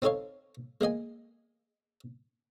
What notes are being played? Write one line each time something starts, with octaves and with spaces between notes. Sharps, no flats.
C4 D#4 A4 C#5 F5
G#3 A#3 D#5 G#5